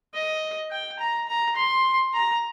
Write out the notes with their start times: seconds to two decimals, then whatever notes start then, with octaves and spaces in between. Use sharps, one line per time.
0.14 D#5
0.71 G5
0.99 A#5
1.28 A#5
1.56 C6
2.14 A#5